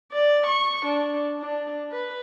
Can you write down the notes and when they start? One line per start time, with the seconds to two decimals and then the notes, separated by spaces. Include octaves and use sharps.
0.13 D5
0.47 C#6
0.86 D4
1.40 D4
1.92 B4